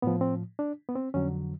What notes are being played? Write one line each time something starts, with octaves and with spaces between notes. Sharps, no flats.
A2 F3 B3
C4
D4
B3
C4
F2 D3 F#3 C#4